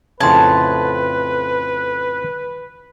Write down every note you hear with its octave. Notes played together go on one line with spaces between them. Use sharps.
F2 A2 C#3 B4 A5 C6 G#6